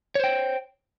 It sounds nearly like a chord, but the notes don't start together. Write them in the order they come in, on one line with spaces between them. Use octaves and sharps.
C#5 C5 G5